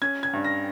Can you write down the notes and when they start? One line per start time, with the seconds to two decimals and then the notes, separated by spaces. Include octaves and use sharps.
0.02 C#4 G#6
0.23 G#6
0.33 G2
0.44 A#6